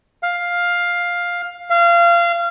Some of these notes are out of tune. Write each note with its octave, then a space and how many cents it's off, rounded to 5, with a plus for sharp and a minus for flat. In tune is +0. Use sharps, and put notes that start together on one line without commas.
F5 +10
F5 -25